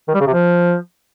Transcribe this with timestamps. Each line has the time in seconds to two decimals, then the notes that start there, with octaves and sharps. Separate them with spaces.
0.08 D#3
0.14 G3
0.21 C#3
0.27 C3
0.33 F3